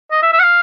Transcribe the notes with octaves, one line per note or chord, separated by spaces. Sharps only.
D#5
E5
E5
F#5
F5